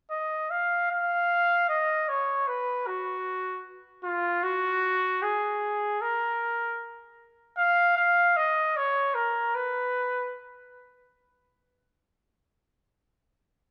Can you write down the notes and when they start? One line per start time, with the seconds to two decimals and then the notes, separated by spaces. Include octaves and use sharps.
0.11 D#5
0.51 F5
0.90 F5
1.69 D#5
2.09 C#5
2.47 B4
2.87 F#4
4.04 F4
4.43 F#4
5.22 G#4
6.01 A#4
7.57 F5
7.97 F5
8.36 D#5
8.76 C#5
9.14 A#4
9.55 B4